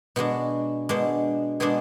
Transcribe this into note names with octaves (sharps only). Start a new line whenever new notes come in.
B2 G#3 D4 F#4
B2 G#3 D4
B2 G#3 D4 G#4